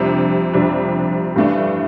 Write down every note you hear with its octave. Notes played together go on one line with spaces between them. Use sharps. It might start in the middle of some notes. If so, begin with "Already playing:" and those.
Already playing: F2 C3 G3 D4
F2 C3 G3 D4
G2 E3 A3 D4